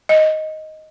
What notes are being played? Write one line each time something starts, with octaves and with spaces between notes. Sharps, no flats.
D#5